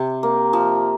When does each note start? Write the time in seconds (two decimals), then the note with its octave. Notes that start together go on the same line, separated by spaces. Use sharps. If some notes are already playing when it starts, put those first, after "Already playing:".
Already playing: C3
0.23 A#3
0.53 F3